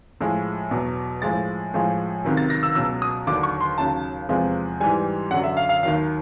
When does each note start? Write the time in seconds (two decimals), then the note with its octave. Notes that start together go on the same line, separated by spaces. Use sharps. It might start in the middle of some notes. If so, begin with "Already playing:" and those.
0.20 A2 F3 G#3
0.71 E2 B2 F#3
1.22 A2 F3 G#3 A6
1.74 A2 F3 G#3
2.25 C#2 C3 D#3 F#3
2.37 A6
2.50 A#6
2.63 E6
2.75 C#2 B2 F#3 E6
3.02 D#6
3.27 D#2 D3 F#3 D6
3.43 C#6
3.60 C6
3.78 D#2 C#3 F#3 A5
4.29 E2 C3 F3 G#3
4.80 G#2 E3 G3 G#5
5.31 F#2 F#5
5.34 D3 F#3
5.44 E5
5.57 F5
5.69 F5
5.83 D#2 D#3 F#3 F5